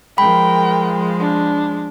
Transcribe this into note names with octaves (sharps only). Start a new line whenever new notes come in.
F3 G#3 A#4 G5 B5
D4